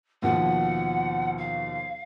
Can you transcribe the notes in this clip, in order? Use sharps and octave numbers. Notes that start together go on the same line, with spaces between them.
D#2 B2 F3 F#5
F5